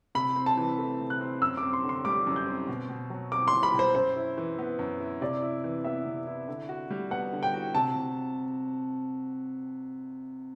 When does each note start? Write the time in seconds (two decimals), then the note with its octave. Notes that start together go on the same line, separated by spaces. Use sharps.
0.15 C3 B5
0.36 C4
0.46 A5
0.57 E3
0.78 A3
1.00 C3
1.10 F#6
1.21 C4
1.41 F#2 E6
1.57 D6
1.63 C4
1.73 C6
1.84 D3
1.89 C6
2.05 G3 D6
2.27 F#2
2.36 G6
2.47 C4
2.68 B2
2.89 B2
3.10 F#3
3.32 C4 D6
3.48 B2 C6
3.63 B5
3.73 B2
3.79 C5
3.95 F#2 C5
4.16 E4
4.38 E3
4.59 B3
4.79 F#2
5.00 E4
5.21 C3 D5
5.42 E4
5.64 E3
5.85 B3 E5
6.05 C3
6.27 E4
6.48 D3
6.69 F#4
6.91 G3
7.11 B3 F#5
7.33 D3
7.43 G5
7.54 F#4
7.75 C3 A5
7.95 C3